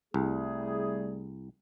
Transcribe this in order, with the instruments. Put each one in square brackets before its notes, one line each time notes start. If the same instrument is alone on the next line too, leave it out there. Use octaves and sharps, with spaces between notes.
[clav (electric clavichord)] C2 [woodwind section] G3 A3 G#4